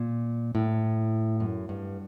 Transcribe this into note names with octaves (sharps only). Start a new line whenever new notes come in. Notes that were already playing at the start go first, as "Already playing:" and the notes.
Already playing: A#2
A2
F#2
G2